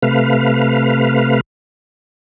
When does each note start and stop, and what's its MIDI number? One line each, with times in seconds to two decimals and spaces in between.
0.03 1.41 48
0.03 1.41 57
0.03 1.41 71
0.03 1.41 77